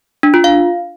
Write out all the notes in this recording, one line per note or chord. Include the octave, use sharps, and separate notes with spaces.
D4
F4
F5